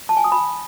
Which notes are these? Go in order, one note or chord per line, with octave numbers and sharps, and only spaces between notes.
A5
G#5
D#6
B5